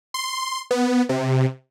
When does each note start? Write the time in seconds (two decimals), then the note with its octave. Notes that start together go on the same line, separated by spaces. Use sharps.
0.14 C6
0.71 B3
1.09 C3